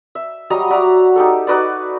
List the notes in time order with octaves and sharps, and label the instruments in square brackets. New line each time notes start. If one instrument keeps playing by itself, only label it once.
[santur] E5
F#3 G3 D#5 A#5
F#4 D5 E5 A#5
D#4 G4 A4
D#4 F#4 B4 D5